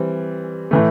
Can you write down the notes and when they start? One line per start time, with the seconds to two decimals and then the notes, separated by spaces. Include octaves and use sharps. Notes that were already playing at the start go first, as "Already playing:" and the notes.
Already playing: E3 G3 C4
0.71 A2 E3 A3